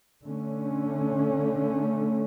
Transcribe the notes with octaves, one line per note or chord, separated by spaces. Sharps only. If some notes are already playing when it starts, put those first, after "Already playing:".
D3 A3 C#4